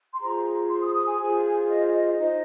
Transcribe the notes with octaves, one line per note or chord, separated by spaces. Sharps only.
C6
F4 G#4 C5 A#5
C6
D#6
D#6
G#5
F4 G#4 C5
D#5
D#5
D#4 C5 D#5